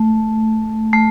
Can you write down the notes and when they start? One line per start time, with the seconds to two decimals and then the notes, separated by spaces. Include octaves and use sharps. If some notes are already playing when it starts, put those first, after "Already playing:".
Already playing: A3
0.93 A3